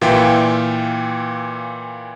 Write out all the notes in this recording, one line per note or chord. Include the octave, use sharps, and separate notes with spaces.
A#2 E3 F4 E5 G5